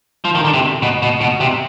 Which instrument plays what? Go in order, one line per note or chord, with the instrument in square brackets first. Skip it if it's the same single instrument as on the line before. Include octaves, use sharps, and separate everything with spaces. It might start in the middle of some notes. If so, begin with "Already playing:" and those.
[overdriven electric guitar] F3
D#3
D3
C3
B2
B2
B2
C3